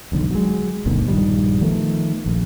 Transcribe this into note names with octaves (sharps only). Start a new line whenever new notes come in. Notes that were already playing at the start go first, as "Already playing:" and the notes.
E1 B1 D3 D#3
F#3 G#3
G1 D2 B2 D#3
A#1 G2 D#3 G3
D#3 F3 A3 B3
A#1